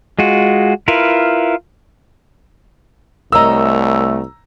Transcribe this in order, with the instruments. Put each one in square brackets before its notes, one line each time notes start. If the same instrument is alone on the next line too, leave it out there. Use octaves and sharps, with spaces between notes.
[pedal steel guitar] G#3 F4 F#4
E4 F4 A#4 B4
[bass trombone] C2 [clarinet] A3 [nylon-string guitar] A#4 C#5 D#5 [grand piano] A#5 E6